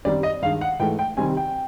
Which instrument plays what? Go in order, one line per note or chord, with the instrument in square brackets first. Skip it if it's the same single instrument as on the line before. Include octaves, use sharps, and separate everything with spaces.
[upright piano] F#2 D#3 G3 C4 D#4 [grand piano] D5
[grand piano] D#5
[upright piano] G2 D#3 G#3 [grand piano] F5
[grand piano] F#5
[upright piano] G#2 E3 A3 [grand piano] G5
[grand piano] G5
[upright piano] C3 D#3 G3 C4 [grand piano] G#5
[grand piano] G5